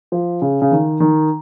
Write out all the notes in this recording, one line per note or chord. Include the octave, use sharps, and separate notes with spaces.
F3
C#3
C#3
D#3
D#3